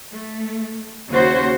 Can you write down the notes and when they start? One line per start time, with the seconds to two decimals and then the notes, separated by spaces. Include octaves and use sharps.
0.13 A3
1.10 D#2 C#3 C#4 F#4 C5